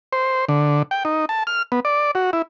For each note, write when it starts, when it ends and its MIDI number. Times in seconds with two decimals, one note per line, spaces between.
0.13 0.45 72
0.49 0.82 50
0.91 1.03 79
1.05 1.25 63
1.29 1.43 81
1.47 1.62 89
1.72 1.80 59
1.85 2.11 74
2.15 2.31 66
2.33 2.42 64